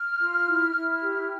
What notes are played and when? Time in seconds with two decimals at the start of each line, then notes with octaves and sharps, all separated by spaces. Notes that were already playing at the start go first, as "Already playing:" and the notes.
Already playing: F6
0.21 F4
0.47 E4
0.75 E4
1.02 G4